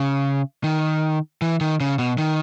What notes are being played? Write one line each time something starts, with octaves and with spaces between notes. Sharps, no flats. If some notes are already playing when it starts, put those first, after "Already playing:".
Already playing: C#3
D#3
E3
D#3
C#3
B2
D#3